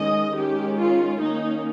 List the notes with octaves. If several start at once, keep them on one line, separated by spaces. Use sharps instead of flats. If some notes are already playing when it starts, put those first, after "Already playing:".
Already playing: D#3 G#3 C#4 D#5
D#3 G#3 C#4 G4
F4
D#3 A#3 C#4 D#4